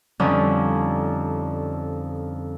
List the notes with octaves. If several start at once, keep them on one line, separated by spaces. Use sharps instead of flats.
F2 D3 F3 G3 C#4 D#4